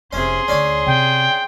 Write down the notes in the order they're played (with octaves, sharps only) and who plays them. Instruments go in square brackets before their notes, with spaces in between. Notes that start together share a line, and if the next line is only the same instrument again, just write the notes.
[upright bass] F1 D#4 [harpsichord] C3 C#4 [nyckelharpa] G#4 C6
[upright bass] D2 D3 [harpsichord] C#4 D4 C#5
[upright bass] C3 [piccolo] G5